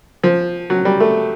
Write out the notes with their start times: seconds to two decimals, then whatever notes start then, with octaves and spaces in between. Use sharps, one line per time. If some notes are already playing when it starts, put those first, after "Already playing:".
0.24 F3
0.70 F#3
0.85 G3
1.00 A3